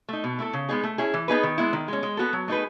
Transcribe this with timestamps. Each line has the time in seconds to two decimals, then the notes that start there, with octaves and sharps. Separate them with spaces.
0.09 A3 D#4
0.24 B2
0.38 A3 E4 A4
0.53 C#3
0.69 G#3 B3 D#4 G#4
0.83 A3
0.98 C#4 E4 G#4
1.14 E3
1.28 B3 D#4 G#4 B4
1.43 D#3
1.58 G#3 B3 E4
1.73 D#3
1.88 G#3 C#4
2.03 G#3
2.17 B3 F#4 A4
2.33 F#3
2.48 A3 D#4 G#4 B4